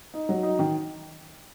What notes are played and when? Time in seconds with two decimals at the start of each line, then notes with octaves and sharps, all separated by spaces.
0.14 D#4
0.29 F#3
0.43 D#4
0.59 D#3